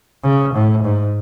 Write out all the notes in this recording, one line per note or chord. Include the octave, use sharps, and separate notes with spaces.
C#3
A2
G#2